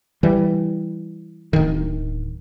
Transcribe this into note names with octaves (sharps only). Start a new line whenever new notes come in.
E3 G3
D1 D#3